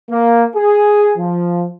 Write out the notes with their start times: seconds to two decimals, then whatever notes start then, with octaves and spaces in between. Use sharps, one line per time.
0.10 A#3
0.56 G#4
1.17 F3